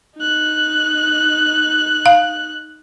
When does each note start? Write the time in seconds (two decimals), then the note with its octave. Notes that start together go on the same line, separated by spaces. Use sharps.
0.17 D#4 F#6
2.06 F5